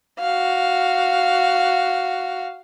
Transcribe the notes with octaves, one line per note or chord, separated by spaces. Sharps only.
F#4 F5